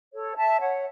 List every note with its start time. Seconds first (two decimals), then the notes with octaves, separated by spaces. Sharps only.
0.13 A4 C#5
0.37 E5 A5
0.60 C#5 F#5